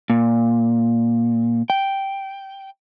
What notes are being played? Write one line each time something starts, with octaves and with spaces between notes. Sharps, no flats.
A#2
G5